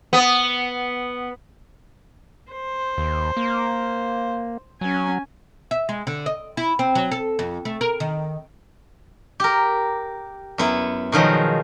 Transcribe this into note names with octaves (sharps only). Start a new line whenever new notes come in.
B3
C5
D#2
A#3
F#3 C#4 G#5
E5
G#3
D3
D#5
E4
C4
F#3
A4
F2
A3
A#4
D#3
G4 A#4
F#2 B3 E4
B2 D#3 F3 F#3 G#3